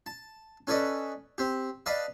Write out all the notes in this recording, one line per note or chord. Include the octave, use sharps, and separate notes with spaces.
A5
C#4 A4 B4 D5 D#5
C4 G4
B4 D5 D#5 F5 A5